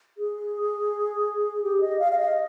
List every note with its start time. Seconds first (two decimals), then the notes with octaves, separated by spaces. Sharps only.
0.18 G#4
1.63 G4
1.81 D#5
1.99 F5
2.12 F5
2.17 D#5